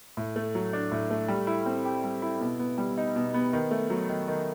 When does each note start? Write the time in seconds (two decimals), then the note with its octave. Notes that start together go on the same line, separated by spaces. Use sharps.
0.17 A2
0.36 A3
0.55 F#3
0.73 D4
0.92 A2
1.10 A3
1.28 G3
1.47 E4
1.66 C4
1.85 G4
2.04 G3
2.22 E4
2.40 B2
2.60 B3
2.78 G3
2.98 D#4
3.16 B2
3.34 B3
3.53 D#3
3.71 A3
3.90 F#3
4.09 D#3
4.28 D#3